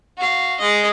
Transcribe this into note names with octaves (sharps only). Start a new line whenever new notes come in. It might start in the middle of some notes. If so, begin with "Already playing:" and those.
F#4 F5
G#3 D#5